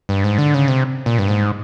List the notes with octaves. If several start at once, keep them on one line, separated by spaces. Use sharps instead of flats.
G2
G#2
D3
C#3
C3
A#2
G2
G#2